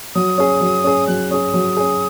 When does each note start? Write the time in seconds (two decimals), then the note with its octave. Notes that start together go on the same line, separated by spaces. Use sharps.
0.15 F#3 D#6
0.38 C#4 G#4
0.61 F#3
0.84 C#4 G#4
1.07 F#3 F#6
1.31 C#4 G#4 D#6
1.54 F#3
1.77 C#4 G#4